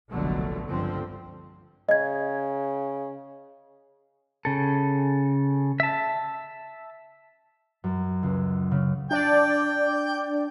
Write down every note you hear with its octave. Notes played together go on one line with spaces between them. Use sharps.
F1 A#1 B2 D3 F#3 A3
G1 C#2 D3 F3 C4
C#3 D#5 G#6
C#3 A4
E5 A5
F#2
C#2
C#3
D4 D5 G5